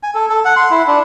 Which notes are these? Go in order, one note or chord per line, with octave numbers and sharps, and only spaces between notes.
G#5
A4
A4
F#5
C6
E4
D4